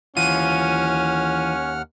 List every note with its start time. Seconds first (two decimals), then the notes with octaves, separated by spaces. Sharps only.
0.17 D#2 E3 C#4 F4 F#5 F6 D#7